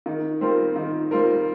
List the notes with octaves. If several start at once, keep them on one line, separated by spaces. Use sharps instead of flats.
D#3
G3 C4 F4 A#4
D#3
G3 C4 F4 A#4